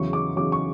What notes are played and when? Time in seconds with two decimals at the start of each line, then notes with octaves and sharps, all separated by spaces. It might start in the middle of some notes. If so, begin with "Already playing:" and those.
Already playing: E2 C#3 F#3 C#6
0.13 D6
0.36 E2 C#3 F#3 D6
0.52 C#6